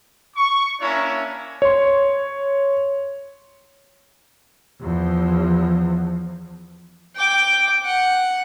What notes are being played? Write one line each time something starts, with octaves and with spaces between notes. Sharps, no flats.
C#6
A#3 C#4 D4 E4 C#5 A#5
C#5 C6
E2 F3
G5 D6
F#5